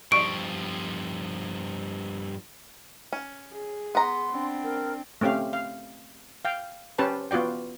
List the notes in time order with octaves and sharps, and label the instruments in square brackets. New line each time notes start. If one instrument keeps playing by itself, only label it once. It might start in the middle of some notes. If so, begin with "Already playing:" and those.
[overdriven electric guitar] G2 F3 [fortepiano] C#6 [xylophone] D7
[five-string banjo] C#4
[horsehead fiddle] G#4
[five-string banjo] B3 A#5 [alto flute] C6
[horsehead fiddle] C4 D4
[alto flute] A#4
[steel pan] A3 C4 C#4 G4 F5
F5
F5 G5
C#4 G4 B4 C5 A5
B3 F4 F#4 D5 G5